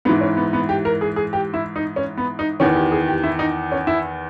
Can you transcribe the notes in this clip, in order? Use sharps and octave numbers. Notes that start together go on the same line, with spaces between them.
G#2 E3 B3
C#4
B3
B3
G4
A#4
G#4
G#4
G4
E4
D#4
C#4
B3
D#4
E2 D#3 C#4
G4
G#4
G4
E4
D#4
C#4
E4